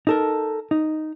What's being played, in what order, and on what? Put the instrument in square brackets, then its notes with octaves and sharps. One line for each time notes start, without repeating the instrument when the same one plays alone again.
[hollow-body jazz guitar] D#4 A4 A#4
D#4